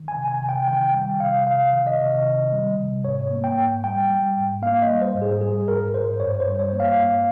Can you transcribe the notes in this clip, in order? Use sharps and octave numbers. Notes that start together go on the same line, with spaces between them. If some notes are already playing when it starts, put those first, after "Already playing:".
Already playing: D#3
G#5
C3
G#5
C3
G5
D#3 G5
G3 G5
C3 F5
C3 F5
D#3
D#5
C3
D#3
G3
C3
G#2 C#5
A#3
G5
G#2
G3 G5
G3
G#2
A#3 F5
D#5
G3
C5
G#2
G#4
G3 G#4
G#2 A#4
G#2 C5
G2 C#5
C5
G3
C#5
A#3
F5
G2